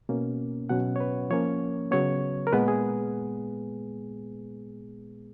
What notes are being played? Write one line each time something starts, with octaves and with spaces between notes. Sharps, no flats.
B2 A#3 C#4
B2 F#3 C#4 F#5
C#5
B4
F3 A#3 C#4 C#5
C#3 F#3 B3 C#5
A#4
A#2 G#3 B3 B4
G#4